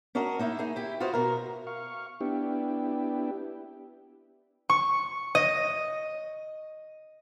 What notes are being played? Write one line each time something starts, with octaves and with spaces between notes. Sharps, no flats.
C#4 D4 F#4 A#4 D#5
A#3 D#4 E4 E5
D#4 G#4
E4 G4
F4 F#4 B4 C5 D#5
B2 A#4
F5 C#6
B3 D4 E4 G4
C#6
D#5